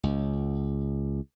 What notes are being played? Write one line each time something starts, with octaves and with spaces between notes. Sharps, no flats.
C#2